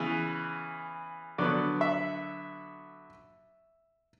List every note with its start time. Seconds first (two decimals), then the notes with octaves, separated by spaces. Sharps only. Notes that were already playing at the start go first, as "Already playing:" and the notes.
Already playing: C#3 E3 B3
1.38 D3 F#3 B3 D5
1.81 E5